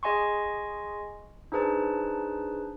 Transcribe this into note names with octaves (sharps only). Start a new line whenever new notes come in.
G#4 D#5 G#5 C6 C#6
D4 D#4 G#4 B4 C5 A5